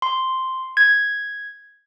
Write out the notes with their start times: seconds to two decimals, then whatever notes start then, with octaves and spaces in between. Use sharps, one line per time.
0.02 C6
0.77 G#6